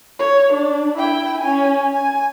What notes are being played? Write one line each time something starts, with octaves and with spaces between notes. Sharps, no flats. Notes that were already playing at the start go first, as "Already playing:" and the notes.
C#5
D4
E4 G5
C#4 G#5
G#5